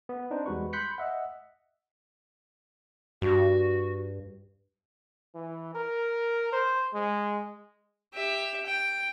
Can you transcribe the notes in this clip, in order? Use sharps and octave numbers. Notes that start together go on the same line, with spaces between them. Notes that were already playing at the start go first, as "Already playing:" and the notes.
B3
C4 D4 D#4 B4 C5
E2 G3 G#3 F#4 B4 C#6
B5 C6 F#6 G6 B6 C#7
D#5 E5 F#5
G2 F#4
E3
A#4
C5
G#3
G4 E5
G5